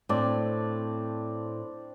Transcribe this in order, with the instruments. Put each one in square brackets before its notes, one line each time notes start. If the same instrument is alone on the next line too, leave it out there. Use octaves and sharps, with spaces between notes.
[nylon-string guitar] A2 [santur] C4 D4 D5